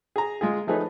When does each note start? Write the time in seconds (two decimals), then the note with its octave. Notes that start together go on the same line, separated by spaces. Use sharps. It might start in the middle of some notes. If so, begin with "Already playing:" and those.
0.16 G#4 A#5
0.41 G#3 F4 G#4
0.67 F3 A3 D#4 G#4 B4 C#5